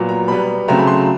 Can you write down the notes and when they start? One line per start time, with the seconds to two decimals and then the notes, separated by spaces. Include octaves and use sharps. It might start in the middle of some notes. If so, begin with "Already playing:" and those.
Already playing: A#2 F#3 B3
0.09 A#5
0.28 B2 G3 B3 B5
0.68 C#3 F#3 A3 C4 A#5
0.78 B5
0.87 C6